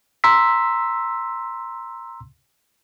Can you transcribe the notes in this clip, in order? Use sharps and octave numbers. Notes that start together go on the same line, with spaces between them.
A#5 C6 E6 B6